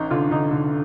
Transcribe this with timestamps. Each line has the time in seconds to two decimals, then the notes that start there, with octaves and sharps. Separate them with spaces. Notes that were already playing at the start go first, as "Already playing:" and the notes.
Already playing: A1 D#4
0.11 D3 F4
0.31 D3 D#4
0.51 D3